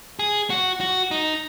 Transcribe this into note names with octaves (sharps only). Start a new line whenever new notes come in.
G#4
F#4
F#4
D#4